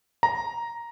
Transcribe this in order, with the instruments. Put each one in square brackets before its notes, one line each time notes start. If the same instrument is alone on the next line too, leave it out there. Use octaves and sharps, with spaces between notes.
[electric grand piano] A#5